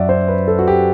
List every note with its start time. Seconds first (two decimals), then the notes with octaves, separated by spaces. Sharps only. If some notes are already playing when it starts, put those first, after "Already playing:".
Already playing: F#2 F#3 D5 E5 F#5
0.09 C5
0.28 B4
0.48 A4
0.59 F#4
0.68 G4